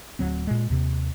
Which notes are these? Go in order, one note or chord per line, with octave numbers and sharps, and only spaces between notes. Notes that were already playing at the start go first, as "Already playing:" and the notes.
D1 G#1 F#3 C4
A#2 G#3
D#2 C3